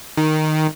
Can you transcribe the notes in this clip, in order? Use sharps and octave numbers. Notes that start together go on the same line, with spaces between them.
D#3